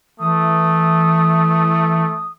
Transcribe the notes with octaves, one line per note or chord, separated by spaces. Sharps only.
E3 A3 D#6